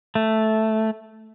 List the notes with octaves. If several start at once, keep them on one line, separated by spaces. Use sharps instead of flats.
A3